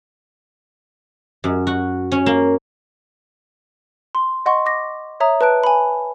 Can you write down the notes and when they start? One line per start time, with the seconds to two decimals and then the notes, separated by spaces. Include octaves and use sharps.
1.44 F#2
1.67 F#4
2.12 C#4
2.26 A#3
4.15 C6
4.46 D#5 F#5 C6 C#6
4.66 D6 A#6
5.20 C#5 E5 A#5 D#6
5.41 B4 A5 F#6 D7
5.64 G#5 B5